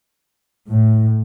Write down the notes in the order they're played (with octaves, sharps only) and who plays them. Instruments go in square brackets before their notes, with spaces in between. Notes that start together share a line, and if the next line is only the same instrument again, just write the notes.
[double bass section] A2